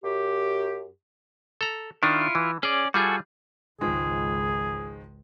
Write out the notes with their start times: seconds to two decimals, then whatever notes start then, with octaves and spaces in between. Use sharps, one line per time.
0.04 F#2 G4
1.61 A4 A#5
2.03 D#3 D4 E4 F4
2.35 E3
2.63 C#4 G#4 D5
2.94 G3 F4 F#4 G#4 A4 G#5
3.81 G#1 C#2 D#3 F3 G#3 G#4